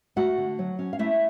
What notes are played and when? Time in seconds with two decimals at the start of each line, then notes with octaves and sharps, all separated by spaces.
0.16 A3 F#4 F#5
0.38 D3
0.59 F#3
0.79 C#4
0.93 F5
0.99 A3 E4 E5